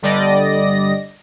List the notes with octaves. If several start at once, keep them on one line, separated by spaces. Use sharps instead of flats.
G1 D3 G3 D5 D#5 A#6